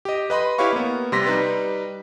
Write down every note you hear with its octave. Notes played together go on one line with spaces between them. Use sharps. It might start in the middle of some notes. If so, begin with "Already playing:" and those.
G4 D#5
B4 D#5 B5 C6
E4 G4 B4 C#5 F5 C#6
A#3 B3
C3 G3 C6 A#6 B6
G3 D#4 B4